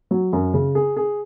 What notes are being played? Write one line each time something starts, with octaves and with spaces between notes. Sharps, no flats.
F#3
F#2
C#3
G#4
G#4